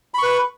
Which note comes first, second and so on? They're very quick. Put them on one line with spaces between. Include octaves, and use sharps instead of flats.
B5 C#6 B4